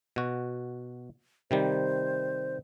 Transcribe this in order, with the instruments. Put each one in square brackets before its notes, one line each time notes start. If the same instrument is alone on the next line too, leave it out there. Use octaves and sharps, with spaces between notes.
[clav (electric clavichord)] B2 F#4
[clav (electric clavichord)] C3 D#3 G3 [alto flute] C5